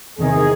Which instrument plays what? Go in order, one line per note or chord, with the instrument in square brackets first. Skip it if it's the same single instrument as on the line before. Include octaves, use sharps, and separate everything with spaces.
[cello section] E2 C3 D#3 [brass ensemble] G#4